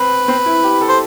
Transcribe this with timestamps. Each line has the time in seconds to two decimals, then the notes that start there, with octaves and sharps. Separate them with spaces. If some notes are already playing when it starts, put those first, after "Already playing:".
Already playing: C4 B4
0.28 C4
0.46 E4
0.63 G4
0.81 A4
0.88 C5